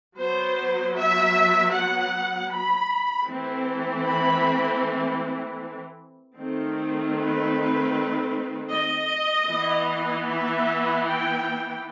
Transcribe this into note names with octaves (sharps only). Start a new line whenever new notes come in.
F#3 B3 C5
E5
F#5
B5
E3 A3 C4
B5
D#3 A3 C4
B4
D#5
E3 B3
E5
G5